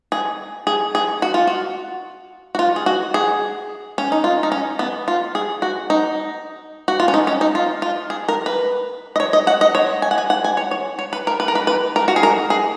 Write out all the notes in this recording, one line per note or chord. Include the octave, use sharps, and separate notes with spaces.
G#4
G#4
G#4
F#4
F4
F#4
F#4
F4
G#4
F#4
G#4
C#4
D#4
F4
D#4
C#4
B3
F4
G#4
F#4
D#4
F#4
F4
C#4
D#4
C#4
D#4
F4
F4
G#4
A#4
B4
D#5
C#5
D#5
F#5
D#5
C#5
G#5
F#5
G#5
F#5
G#5
C#5
C#5
C#5
B4
A#4
B4
A#4
B4
B4
A#4
F#4
G#4
A#4
G#4